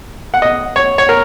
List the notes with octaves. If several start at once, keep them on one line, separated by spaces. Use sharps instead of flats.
F#5
D#5
C#5
C#5
A#4